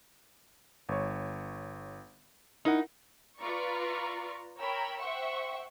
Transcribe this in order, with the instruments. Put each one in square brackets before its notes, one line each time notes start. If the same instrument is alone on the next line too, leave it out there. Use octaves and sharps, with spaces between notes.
[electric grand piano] G1 C#5
[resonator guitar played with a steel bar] D#4 [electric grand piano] E4 A#4 F#5
[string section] F4 B4 D5 A#5 C#6
A#4 C#5 G5 A#5 B5 E6
C5 E5 F#5 G5 C#6